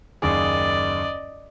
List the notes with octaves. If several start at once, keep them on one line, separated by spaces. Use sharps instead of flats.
F#1 D#2 G#4 D5 D#5